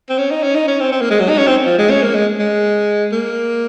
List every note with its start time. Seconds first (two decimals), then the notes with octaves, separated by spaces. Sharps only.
0.10 C4
0.18 C#4
0.31 D#4
0.43 C#4
0.55 D#4
0.68 C#4
0.80 C4
0.92 C4
1.01 A#3
1.11 G#3
1.20 F#3
1.29 D#4
1.38 C#4
1.47 C4
1.65 F3
1.78 G#3
1.90 C#4
2.03 A#3
2.15 G#3
2.39 G#3
3.12 A#3